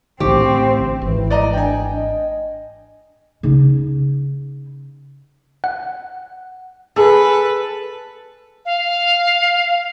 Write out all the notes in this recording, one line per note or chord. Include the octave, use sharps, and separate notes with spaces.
A1 D3 C4 G4 G5 C#6
G#1 E3
D5 D#5 A#5
D4 G5 G#5
D#5
C#3 D#4
F#5
G#4 A4 B4
F5